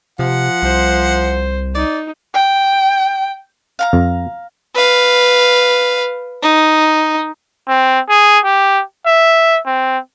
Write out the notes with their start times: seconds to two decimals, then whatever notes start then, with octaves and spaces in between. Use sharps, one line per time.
0.19 C3 F3 F#5
0.63 C2 C5
1.75 D#4 D5
2.35 G5
3.79 F5 F#5 A#5
3.93 F2
4.75 B4 F5
6.43 D#4
7.68 C4
8.09 G#4
8.44 G4
9.06 E5
9.66 C4